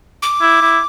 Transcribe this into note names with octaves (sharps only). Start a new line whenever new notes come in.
D6
E4
E4